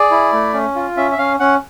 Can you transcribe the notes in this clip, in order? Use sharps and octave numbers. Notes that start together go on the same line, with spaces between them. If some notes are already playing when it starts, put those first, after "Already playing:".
Already playing: G#4 D5
E4
A3
C#4
F4
C#4 E5
E5
C#4 F5
C#4 F#5